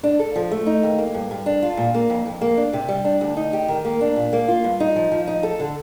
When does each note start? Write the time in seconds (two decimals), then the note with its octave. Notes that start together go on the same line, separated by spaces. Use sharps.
0.03 D4
0.19 A4
0.36 F3
0.51 A3
0.66 D#4
0.83 D#2
0.98 A#3
1.14 G2
1.31 G2
1.46 D4
1.62 F4
1.77 A#2
1.94 A#3
2.10 F2
2.26 F2
2.41 A#3
2.57 D4
2.73 C3
2.88 G3
3.04 D4
3.21 D2
3.37 D#4
3.53 G4
3.68 D#3
3.85 A#3
4.01 D4
4.16 A#2
4.33 A#3
4.48 F4
4.64 G2
4.80 D#4
4.96 F3
5.11 F3
5.27 D#4
5.43 A4
5.60 D3